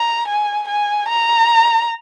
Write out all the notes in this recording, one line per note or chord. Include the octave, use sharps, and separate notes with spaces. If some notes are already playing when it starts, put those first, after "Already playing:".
Already playing: A#5
G#5
G#5
A#5